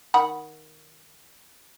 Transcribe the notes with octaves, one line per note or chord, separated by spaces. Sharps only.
D#3 F#5 B5